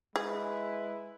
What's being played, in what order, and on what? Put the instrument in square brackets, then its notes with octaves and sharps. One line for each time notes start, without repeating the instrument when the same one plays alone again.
[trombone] G#3 [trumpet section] E4 B4 [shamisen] G#4